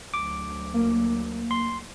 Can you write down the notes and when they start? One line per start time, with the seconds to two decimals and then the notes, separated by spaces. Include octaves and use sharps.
0.14 D2 F#3 D6
0.74 A#3
1.51 C6